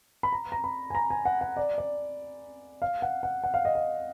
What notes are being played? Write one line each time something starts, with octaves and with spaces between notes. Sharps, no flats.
B5
A#5
A#5
B5
G#5
A#5
G#5
F#5
F#5
D5
D5
F5
F#5
F#5
F#5
F5
D#5
F5